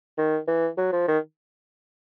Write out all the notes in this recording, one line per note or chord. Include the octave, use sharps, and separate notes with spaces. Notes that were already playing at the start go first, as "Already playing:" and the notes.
D#3
E3
F#3
F3
D#3